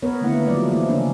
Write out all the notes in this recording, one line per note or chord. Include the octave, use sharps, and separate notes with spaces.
B3 A#4 B4 C#5
D3 D#3 A3 A#3 E4 F#5
F3 F#3 G#3 D5
E3 A#3 E4
C#3 F3 A#3 C#4 D4